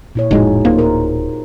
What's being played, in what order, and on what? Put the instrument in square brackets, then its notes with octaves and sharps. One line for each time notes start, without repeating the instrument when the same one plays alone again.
[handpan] A#2 E4 C#5
[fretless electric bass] F1 A2 G#3 [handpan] D#4 F#4 G#4
[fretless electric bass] D1 A#3 [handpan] D#4 F4 C5
[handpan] A#4